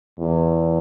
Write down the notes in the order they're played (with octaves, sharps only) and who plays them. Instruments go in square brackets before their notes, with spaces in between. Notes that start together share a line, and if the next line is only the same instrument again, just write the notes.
[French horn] E2